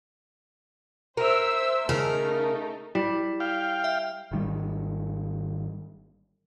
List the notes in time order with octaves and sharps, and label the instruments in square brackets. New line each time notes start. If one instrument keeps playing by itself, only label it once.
[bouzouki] A#4 [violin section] C5 E5 E6
[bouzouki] C#3 [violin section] A3 D#4 [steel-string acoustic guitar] A#4
[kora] G3 [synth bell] E4
[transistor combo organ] F5 G5
[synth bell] E5
[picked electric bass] G#1 D#3 G3